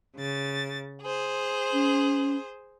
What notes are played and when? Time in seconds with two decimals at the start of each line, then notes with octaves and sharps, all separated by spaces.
0.16 C#3 A6
1.01 G#4 C5
1.73 C#4